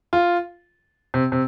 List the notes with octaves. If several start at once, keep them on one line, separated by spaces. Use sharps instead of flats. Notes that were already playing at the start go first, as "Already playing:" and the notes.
F4
C3
C3